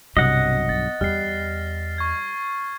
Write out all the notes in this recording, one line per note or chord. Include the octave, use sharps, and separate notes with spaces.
B1 G2 C3 F#3 D#5 F#5
B3 A6
E2 G3 F6 C7
C#6 G#6